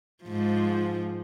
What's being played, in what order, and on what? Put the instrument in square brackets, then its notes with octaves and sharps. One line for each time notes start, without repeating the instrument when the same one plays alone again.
[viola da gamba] G#2 F3